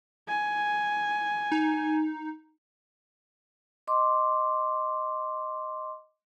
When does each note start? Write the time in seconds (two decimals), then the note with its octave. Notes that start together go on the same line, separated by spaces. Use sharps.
0.28 G#5
1.52 D#4
3.87 D#5 C6 D6